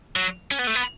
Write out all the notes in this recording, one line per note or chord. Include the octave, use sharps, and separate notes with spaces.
F#3
C#4
B3
A3
B3